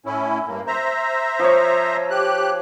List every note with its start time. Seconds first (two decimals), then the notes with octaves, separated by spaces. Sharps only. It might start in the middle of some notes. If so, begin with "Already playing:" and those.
0.06 A2 C#4 E4
0.47 G2 A#3
0.67 C5 E5 A#5
1.39 F3 C#5
2.10 G4 F#6